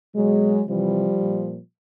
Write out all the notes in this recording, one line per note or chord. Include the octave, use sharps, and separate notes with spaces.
B2 F#3 G#3
C3 E3 F3 G3
A#2